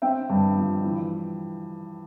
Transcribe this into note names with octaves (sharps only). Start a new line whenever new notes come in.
C4 E5 G5
G2
F3
E3